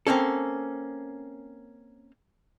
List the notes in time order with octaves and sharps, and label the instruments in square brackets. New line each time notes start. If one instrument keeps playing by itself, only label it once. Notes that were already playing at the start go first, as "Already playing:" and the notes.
[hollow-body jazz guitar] A#3 C4 C#4 A4